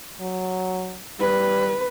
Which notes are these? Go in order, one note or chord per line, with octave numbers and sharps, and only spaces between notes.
F#3
G3 B4